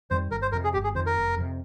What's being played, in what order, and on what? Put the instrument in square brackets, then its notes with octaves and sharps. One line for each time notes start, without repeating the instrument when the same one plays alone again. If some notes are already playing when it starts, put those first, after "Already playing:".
[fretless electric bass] F2 D#3 G3 [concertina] C5
[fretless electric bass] G1 [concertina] A#4
[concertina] C5
[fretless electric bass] F2 C3 [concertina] A#4
[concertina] G#4
[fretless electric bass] G1 [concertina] G4
[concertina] G#4
[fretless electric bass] F2 D#3 [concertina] C5
[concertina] A#4
[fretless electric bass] F1
F2 C3